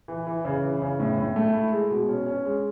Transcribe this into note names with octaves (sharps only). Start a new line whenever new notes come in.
E3
E3
C#3
E3
C#3
A2
A2
A3
E4
G#3
B2
C#4
C#4
G#3